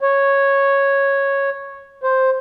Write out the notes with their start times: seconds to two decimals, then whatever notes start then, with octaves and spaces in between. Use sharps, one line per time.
0.01 C#5
2.04 C5